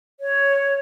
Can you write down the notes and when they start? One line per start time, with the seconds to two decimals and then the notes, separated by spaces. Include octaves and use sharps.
0.20 C#5